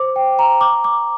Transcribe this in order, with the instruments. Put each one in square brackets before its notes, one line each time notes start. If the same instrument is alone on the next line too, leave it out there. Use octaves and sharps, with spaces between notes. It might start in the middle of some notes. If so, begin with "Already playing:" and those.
Already playing: [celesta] C5 D6
G5
A#5
D6
D6